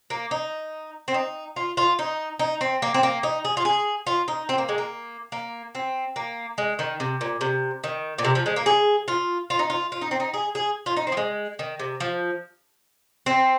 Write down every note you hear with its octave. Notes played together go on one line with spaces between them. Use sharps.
A#3
D#4
C4
D#4
F4
F4
D#4
D#4
C4
A#3
C4
A#3
D#4
G#4
F4
G#4
F4
D#4
C4
A#3
G#3
A#3
A#3
C4
A#3
G#3
D#3
C3
A#2
C3
D#3
A#2
C3
F3
G#3
A#3
G#4
F4
F4
D#4
F4
F4
D#4
C4
D#4
G#4
G#4
F4
D#4
C4
F3
G#3
D#3
C3
F3
C4